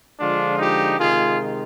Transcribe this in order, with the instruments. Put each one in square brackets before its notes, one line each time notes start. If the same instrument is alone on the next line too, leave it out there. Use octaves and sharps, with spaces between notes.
[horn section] D3 F3 G#3 D4 F4
D#4 G4
C3 D#3 G#3 F4 G#4